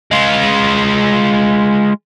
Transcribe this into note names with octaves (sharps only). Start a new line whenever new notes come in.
G#3 F4